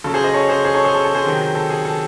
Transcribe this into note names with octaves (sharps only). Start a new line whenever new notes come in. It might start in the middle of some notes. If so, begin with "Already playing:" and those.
C#3 F#3 A4
G#4 C5
C5 D#5
A4 C#5
G#4 C5
G#4 C5
A4 C#5
G#4 C5
A4
A4
G#4 C5
C3 D#3 F#3
A4
G#4
A4